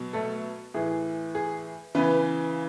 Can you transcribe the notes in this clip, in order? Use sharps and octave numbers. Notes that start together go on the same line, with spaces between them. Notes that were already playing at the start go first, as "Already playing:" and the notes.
Already playing: B2 F#3
A3 A4
A2 E3 G#4
G#4
C#3 E3 B3 B4